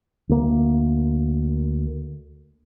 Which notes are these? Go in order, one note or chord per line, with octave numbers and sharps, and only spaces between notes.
D2 A#3